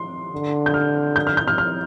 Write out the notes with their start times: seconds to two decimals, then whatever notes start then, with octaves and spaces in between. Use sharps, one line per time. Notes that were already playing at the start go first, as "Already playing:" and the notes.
Already playing: C6
0.32 D3
0.66 G6
0.74 F6
1.16 G6
1.27 F6
1.37 G6
1.48 F6
1.58 F6